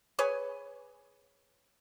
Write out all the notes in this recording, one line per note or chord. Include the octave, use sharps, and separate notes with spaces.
G#4 B4 C#5 G#5